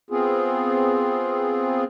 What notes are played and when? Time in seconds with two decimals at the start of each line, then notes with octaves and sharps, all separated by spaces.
0.10 B3 C4 F4 G#4